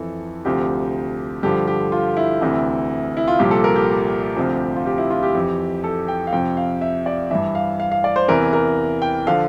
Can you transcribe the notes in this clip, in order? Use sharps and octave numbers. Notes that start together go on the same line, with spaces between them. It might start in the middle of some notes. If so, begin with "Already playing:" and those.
Already playing: F2 E3 A4
D2 C3 F3 G4
G2 D3 F3 G4
G4
F4
E4
D2 C3 E3
E4
F4
C2 A#2 F3 G4
A4
A#4
G4
D2 C3 F3
F4
G4
E4
F4
G4
F2 E3
A4
G5
F5
F2 C3 F3 G5
F5
E5
D5
G2 E3 E5
F5
F5
F5
D5
C5
E2 C3 E3 A#4
A#4
G5
D3 F3 F5